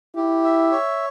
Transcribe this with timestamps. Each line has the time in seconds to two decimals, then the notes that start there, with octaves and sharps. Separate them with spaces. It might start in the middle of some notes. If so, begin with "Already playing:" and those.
0.16 E4 G4
0.44 E5
0.72 C#5